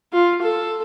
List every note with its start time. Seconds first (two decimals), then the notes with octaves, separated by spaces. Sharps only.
0.13 F4
0.42 A4